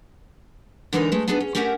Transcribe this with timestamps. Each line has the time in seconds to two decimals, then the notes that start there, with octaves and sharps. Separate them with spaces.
0.93 D3 E3 G#3 D#4 A#4 C#5
1.12 G#3 A3
1.28 B3 D4 D#4 G#4 B4
1.40 C#4
1.55 A3 C#4 G4 A#4 E5 F#5